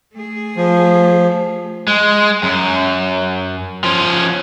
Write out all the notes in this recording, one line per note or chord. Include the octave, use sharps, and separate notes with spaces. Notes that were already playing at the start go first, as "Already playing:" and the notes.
A3 G#4
F3
G#3
F#2
F3 C#4